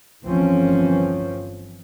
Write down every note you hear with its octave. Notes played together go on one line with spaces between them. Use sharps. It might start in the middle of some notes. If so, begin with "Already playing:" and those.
G1 D2 E3 F3 C4 C#4